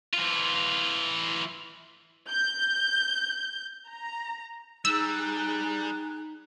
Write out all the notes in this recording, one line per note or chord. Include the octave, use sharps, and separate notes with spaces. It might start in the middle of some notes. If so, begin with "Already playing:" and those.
E3 F4
G6
A#5
G3 D#4 G#4 E6 F#6